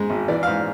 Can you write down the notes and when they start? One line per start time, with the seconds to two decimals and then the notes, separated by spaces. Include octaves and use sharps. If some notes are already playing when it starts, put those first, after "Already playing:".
Already playing: G#2 G#3
0.10 G#1
0.28 E3 D5
0.43 G#2 F5